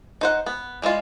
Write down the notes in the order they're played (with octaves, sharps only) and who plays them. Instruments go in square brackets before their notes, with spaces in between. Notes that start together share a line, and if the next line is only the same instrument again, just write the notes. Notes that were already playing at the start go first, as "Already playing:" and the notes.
[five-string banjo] D#4 C5 F#5
B3
G3 G#3 E4 F4